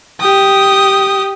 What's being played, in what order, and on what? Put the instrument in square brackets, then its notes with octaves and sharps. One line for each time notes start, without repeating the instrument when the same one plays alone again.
[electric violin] G4 D#6